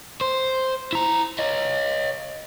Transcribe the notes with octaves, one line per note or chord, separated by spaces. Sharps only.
C5
E4 A#5
C#5 D#5